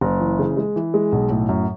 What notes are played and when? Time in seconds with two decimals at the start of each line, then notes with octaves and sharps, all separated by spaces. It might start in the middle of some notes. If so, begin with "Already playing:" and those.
0.01 F#1
0.20 E3
0.39 C#3
0.57 G#3
0.76 E3
0.94 G#3
1.12 B1
1.30 A2
1.49 F#2